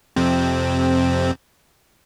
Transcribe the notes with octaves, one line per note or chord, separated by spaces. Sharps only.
F2 C3 C4